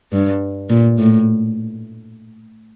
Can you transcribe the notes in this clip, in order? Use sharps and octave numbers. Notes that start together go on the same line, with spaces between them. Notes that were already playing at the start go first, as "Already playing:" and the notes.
G2
A#2
A2